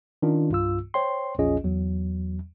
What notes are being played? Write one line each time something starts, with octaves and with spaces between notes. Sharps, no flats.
D#3 C#4 D4 F4
C2 G2 F4 E6
C5 C#5 G5 C6
A#1 E2 C#4 F4 G#4 D#5
E2 F#3